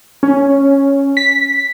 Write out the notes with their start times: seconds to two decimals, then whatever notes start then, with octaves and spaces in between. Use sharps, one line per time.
0.23 C#4
1.17 B6